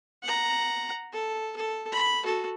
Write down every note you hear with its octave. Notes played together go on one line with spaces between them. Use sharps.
F#5 A#5
A4
A4
B5
F#4 A4